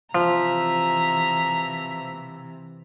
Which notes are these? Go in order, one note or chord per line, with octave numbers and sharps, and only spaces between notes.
C3 E3 F3 E5 A#5